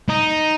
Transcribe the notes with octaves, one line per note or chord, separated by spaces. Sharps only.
D#4